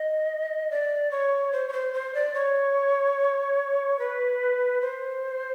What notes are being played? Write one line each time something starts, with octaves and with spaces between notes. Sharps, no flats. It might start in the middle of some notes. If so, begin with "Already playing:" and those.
Already playing: D#5
D5
C#5
C5
C#5
C5
C5
D5
C#5
B4
C5